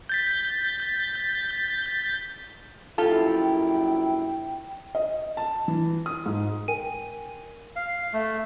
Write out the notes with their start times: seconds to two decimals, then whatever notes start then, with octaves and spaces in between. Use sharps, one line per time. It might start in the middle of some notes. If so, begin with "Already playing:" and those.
0.09 G6 A6 B6
2.98 A#1 F#2 E4 F4 G4 A4 G5
4.95 D#5
5.37 A5
5.68 E3
6.06 D#6
6.26 G#2
6.68 A#4 G5 G#5 D#7
7.76 F5
8.13 A3